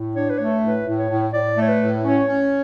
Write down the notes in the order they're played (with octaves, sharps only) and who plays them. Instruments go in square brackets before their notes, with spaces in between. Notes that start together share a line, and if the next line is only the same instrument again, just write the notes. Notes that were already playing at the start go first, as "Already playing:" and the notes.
Already playing: [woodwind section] A2
[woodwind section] D4 [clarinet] C#5
[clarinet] B4
[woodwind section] A3 [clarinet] C#5
[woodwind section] A2 [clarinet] B4
[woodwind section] A2
[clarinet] C#5
[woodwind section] A2
[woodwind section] A2 [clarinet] D5
[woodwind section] A3
[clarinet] C#5
B4
[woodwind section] A2
[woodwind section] C#4 [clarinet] C#5
[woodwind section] C#4